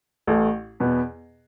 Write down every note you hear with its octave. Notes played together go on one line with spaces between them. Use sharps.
A1 A2 A3
E2 B2 B3